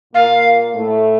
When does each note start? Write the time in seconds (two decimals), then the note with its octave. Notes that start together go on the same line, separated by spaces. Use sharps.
0.14 A#2 A#3 F5
0.73 A2 A3